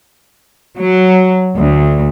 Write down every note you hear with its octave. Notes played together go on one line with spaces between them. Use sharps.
F#3
D2